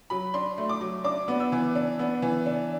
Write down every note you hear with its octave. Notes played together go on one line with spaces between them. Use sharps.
F#3 B5
D4 C6
A3
D6
F#3
D4 D6
B3
E6
E3
D4
B3
E3
D4